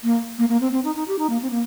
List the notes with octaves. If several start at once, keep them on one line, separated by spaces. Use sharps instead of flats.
A#3
A#3
A#3
C4
C4
D#4
D#4
G4
D#4
A#3
C4
A#3